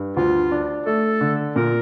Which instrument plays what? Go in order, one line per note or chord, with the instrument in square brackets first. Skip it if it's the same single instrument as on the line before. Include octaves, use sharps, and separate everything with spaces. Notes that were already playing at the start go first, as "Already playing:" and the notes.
Already playing: [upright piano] G2
[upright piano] D2 [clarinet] F4
[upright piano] D4
[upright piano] A3 [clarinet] A4
[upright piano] D3
[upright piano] A#2 [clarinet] A#4